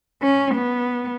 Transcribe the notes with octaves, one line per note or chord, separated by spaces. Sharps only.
C#4
B3